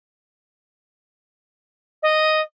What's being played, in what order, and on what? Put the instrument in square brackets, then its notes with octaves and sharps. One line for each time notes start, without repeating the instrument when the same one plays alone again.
[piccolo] D#5